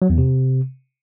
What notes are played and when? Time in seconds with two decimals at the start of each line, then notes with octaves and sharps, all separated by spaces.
0.02 F#3
0.10 E2
0.18 C3